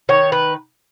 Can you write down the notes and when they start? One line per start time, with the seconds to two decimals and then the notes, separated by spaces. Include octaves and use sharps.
0.09 D#3 C#5
0.32 B4